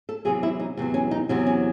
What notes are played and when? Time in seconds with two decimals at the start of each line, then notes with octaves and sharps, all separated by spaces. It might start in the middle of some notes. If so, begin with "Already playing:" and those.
0.09 A4
0.25 E2 C3 F#3 G#4
0.43 E4
0.60 D#4
0.77 E2 C3 F#3
0.94 C#4
1.11 D#4
1.29 E2 C3 F#3
1.46 C#4